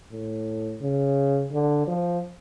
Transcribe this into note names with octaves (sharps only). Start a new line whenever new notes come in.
A2
C#3
D3
F3